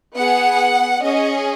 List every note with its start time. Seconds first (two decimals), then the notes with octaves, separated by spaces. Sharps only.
0.15 B3 G#4 F#5
1.02 C#4 G#4 D#5